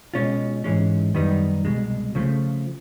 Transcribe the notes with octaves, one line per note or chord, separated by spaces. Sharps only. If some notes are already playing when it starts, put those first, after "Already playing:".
B2 G#3 C#4 F4
G#2 E3 G#3 C#4
F#2 D#3 G3 B3 D#4
C2 B2 G#3
C#3 F3 A3